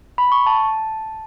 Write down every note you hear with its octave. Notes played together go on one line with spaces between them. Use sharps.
B5
C#6
A5